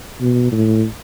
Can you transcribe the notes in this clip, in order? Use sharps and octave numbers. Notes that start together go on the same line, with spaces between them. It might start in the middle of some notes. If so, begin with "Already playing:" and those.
B2
A2